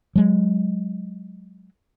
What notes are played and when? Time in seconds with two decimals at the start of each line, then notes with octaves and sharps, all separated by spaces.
0.16 F#3 G#3